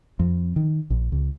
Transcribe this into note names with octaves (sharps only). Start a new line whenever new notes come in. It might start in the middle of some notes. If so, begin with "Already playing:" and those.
F2
D#3
A#1
C#2